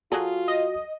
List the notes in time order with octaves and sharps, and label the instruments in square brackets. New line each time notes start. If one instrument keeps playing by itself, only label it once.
[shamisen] F#3 G#4 A4 [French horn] F4 [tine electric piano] F#4
[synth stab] D#5